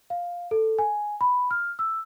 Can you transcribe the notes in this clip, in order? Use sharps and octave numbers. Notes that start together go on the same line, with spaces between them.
F5
A4
G#5
B5
F6
E6